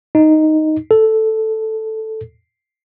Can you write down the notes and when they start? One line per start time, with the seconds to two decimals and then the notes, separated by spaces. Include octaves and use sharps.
0.15 D#4
0.91 A4